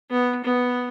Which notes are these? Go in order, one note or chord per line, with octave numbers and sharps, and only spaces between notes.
B3
B3